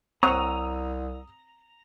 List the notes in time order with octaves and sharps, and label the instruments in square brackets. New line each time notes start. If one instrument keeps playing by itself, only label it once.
[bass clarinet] C2 [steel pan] C4 C#5 F#5 [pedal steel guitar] A#5 [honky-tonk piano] D#6 E6 F7